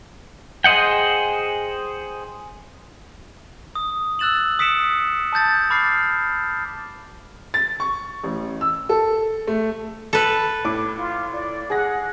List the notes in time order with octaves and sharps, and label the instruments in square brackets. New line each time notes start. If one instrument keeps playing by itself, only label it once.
[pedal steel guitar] G#4 C5 D#5 F#5 G5
[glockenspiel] D#6
E6 F#6 A6 E7 F#7
D#6 B6 C#7 D7 E7
A5 D#6 G6 A6
B5 D6 F6 A6 C7
[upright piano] A6
C#6
A1
E6
A4
A3
[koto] A4 B4 [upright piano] B5
[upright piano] A2 D6
[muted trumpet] F4
D5
[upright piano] G#4 A#6 [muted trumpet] F#5